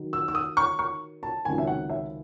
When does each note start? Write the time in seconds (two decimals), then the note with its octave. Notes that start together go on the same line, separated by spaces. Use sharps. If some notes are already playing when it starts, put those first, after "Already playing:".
Already playing: D#3 F#3
0.13 E6
0.28 E6
0.35 D#6
0.57 C#6
0.79 C#6
1.23 A5
1.45 C#2 C3 D#3 F#3 G#5
1.58 E5
1.67 F#5
1.90 E5